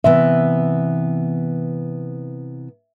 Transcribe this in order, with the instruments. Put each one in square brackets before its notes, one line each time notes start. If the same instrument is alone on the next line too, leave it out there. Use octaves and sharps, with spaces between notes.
[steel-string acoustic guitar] C3 E3 B3 [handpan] E5